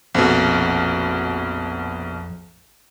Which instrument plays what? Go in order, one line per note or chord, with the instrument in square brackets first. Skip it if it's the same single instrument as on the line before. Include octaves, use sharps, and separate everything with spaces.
[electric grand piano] A#1 B2 [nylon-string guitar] F2